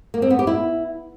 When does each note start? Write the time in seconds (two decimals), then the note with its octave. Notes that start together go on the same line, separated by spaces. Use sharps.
0.14 A#3
0.22 C4
0.30 B3
0.39 G4
0.47 E4